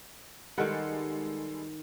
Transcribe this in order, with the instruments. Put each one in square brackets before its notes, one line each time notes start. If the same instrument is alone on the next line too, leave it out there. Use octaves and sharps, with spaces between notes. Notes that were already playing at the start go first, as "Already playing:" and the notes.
[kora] D#3 F#5 [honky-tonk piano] G3 G#3 A4